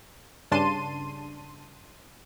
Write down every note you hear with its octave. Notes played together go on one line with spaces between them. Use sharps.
G2 C#3 D4 A5 C6 D#7